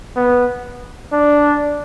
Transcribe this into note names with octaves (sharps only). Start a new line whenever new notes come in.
B3
D4